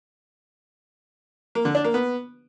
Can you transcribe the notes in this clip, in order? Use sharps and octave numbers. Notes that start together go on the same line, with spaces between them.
A#3
D3
D4
A#3
B3